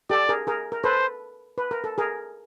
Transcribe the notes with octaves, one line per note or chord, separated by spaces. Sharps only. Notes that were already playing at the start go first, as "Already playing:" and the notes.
G4 A4 D5
G#4 A#4
G#4 A#4
A#4
A4 B4 C5
B4
A#4
A4
G#4 A#4